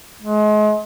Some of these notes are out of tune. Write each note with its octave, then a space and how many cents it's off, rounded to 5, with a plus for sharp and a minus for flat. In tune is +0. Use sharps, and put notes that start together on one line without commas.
G#3 +35